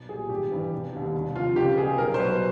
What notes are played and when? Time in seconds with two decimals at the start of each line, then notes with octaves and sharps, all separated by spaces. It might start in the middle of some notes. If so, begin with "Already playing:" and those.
Already playing: B1
0.09 A#2 G3 G#4
0.30 G#1 G4
0.51 G2 E3
0.72 E1
0.93 D#2 D3 G3
1.14 C2
1.35 C3 F4
1.38 F3
1.56 C#2 G4
1.78 B2 G3 G#4
1.98 B1 A#4
2.14 C5
2.19 B2 F#3 B4